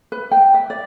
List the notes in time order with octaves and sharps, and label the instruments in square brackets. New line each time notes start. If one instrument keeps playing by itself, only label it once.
[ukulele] B4
G5
E5
D5